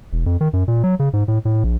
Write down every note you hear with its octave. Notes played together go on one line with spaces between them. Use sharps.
E1
F2
D#3
F#2
A#2
F#3
C#3
G#2
A2
A2
A#1